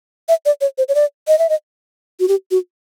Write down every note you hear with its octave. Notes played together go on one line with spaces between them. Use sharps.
E5
D5
C#5
C5
C#5
D5
D#5
E5
D#5
F#4
G4
F#4